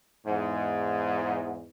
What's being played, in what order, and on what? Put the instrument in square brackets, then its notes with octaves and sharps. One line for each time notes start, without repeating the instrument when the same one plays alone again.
[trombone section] E2 G#2